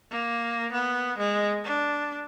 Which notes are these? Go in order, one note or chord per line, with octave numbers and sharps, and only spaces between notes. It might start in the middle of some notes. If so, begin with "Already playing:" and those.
A#3
B3
G#3
D4